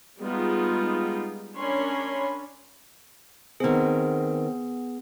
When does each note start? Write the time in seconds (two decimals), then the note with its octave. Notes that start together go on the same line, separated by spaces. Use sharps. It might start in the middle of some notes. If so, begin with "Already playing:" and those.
0.20 G3 G#3 B3 D#4 F4
1.57 C#4 D4 A#4 C#5 B5 C6
3.60 D#3 B3 C4 G#4